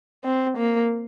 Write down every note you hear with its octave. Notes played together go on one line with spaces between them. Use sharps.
C4
A#3